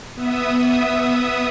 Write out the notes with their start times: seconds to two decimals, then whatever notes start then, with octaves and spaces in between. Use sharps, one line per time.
0.15 B3 E5 D#6